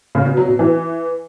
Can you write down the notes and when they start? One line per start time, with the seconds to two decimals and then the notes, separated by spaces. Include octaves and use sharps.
0.15 C#3
0.26 B2
0.37 F#3
0.48 B2
0.59 E3